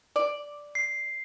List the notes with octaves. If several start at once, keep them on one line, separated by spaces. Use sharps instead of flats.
D5
C7